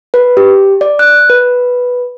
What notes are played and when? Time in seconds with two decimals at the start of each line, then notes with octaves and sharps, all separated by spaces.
0.14 B4
0.37 G4
0.81 D5
0.99 F#6
1.30 B4